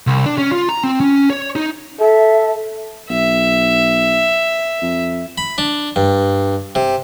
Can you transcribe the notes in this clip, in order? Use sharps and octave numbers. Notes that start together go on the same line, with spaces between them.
C2
D4
C#4
F4
A#5
C4
C#4
C#5
D#4
A4 E5
B1 E5
F2
B5
D4
G2
C3